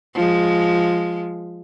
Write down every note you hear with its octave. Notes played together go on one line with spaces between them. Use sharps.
F3 G#3